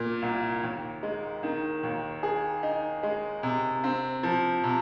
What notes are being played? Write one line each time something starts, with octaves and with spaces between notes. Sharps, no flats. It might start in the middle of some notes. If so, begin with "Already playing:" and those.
Already playing: A#2 A#3
C2
D#2
G#3
D#3
D#2
G#4
D#4
G#3
C3
C4
F3
C3